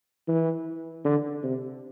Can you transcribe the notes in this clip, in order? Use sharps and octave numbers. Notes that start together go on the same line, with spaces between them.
E3
D3
C3